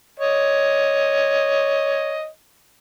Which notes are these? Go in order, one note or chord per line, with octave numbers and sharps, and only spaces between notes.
C#5 D#5